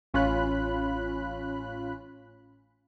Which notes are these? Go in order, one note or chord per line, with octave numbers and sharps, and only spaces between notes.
A1 C#4 F4 B5 F#6